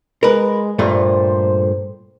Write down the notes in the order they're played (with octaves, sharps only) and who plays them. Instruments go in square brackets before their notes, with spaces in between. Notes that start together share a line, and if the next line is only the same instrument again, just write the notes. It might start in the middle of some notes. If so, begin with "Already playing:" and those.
[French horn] G#3 [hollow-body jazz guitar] A#4 B4
[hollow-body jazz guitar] G2 A#2 A3 [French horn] C5